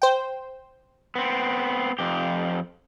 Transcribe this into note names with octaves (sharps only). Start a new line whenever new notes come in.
C5 G5
B3 C4
F2 G4